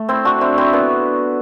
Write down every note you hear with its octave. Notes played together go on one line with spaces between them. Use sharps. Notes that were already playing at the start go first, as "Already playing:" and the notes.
Already playing: A3
C4 E4
D4 F#4
C4 E4
C4 E4
B3 D4